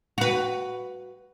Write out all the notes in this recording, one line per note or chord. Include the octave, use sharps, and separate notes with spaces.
F#4 B4